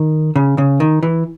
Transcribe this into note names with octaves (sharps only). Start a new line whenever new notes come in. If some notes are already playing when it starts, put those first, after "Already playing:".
Already playing: D#3
C#3
C#3
D#3
E3